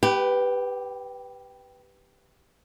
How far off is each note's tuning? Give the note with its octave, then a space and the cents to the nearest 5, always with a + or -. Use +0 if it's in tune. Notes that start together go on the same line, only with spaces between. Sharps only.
G4 +0 B4 +0 G5 -45